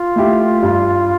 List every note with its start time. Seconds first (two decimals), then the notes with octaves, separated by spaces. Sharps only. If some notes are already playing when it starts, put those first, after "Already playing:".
Already playing: F4
0.16 A3 E4 G4
0.63 G2